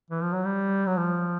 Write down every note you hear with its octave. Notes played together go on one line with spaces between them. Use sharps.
E3
F3
F#3
G3
F#3
F3